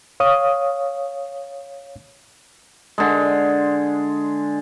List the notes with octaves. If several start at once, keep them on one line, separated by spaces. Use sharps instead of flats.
C#5 F5 D#6
D3 G#3